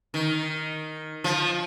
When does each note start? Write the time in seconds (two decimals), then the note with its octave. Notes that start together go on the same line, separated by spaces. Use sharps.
0.14 D#3
1.24 F3